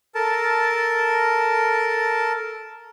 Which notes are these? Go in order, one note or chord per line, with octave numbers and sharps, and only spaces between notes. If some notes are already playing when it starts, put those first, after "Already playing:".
A4 A#4 A5